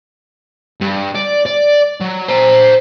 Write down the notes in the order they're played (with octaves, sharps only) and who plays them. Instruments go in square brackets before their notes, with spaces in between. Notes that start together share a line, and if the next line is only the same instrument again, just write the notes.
[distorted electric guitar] G2
D5
D5
F#3
C5 A#5